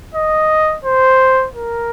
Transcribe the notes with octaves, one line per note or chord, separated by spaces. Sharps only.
D#5
C5
A#4